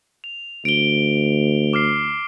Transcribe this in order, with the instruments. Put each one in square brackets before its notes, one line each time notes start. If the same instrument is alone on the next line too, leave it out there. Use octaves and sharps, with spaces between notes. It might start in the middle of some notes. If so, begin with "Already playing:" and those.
[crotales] F7
[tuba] D2 [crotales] D7 G7
[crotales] D6 F6 C7